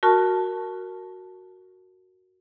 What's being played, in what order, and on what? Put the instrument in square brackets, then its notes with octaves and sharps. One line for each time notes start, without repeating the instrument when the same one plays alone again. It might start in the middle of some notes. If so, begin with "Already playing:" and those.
[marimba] F#4 A#4 A5 C#6 F6